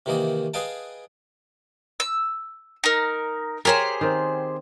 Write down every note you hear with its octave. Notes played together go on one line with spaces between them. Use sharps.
C3 D#3 E3 A#3 D#5
G#4 B4 D#5 F5 G5 A5
E6
D#4 A#4
G4 G#4 A#4 C5 C#5
D#3 C4